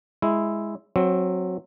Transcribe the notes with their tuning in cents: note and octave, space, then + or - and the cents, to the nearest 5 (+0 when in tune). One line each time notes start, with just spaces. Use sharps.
G#3 +0 E4 +0
F#3 -10 C4 +10